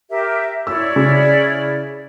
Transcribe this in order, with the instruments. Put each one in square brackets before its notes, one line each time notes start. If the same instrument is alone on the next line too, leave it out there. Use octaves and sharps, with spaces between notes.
[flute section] G4 A#4 E5
[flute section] E4 C#5 D5 [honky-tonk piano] E6
[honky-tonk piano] C#3